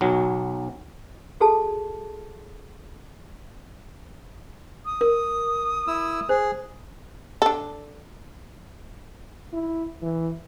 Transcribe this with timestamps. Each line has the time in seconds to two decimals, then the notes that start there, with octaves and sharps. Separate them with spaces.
0.01 B1 F#3
1.40 F#4 G#4 A4 A5
4.85 D#6
5.01 A#4
5.88 E4 E6
6.29 G#4 C5
7.42 D4 A4
9.53 E4
10.02 E3